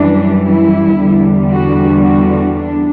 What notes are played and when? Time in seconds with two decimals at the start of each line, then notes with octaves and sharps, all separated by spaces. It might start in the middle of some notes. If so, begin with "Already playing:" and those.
Already playing: F#2 E3 G3 D4
0.44 E4
0.97 E2 D3 G3
1.51 F#4
2.03 F#4
2.56 D4